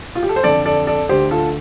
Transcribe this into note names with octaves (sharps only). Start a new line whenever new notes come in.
F4
G4
A4
C5
F2 D3 A4 D5
A4 D5
A4 D5
D2 D3 G4 C5
F4 A4